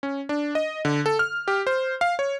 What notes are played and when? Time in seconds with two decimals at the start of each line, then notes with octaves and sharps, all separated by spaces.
0.03 C#4
0.29 D4
0.55 D#5
0.85 D3
1.06 A4
1.19 F6
1.48 G4
1.67 C5
2.01 F5
2.19 C#5